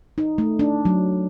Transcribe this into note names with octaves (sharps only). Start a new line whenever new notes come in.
D#4
A3
D4
F#3